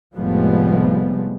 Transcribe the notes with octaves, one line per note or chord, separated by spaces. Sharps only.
F1 A2 F3 G3 G#3 B3